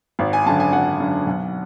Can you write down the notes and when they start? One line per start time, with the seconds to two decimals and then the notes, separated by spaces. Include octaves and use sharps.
0.19 G#1
0.33 G#5
0.46 F#2 D3 A5
0.60 G#5
0.73 G#1 F#5
1.00 F#2 D3
1.27 B1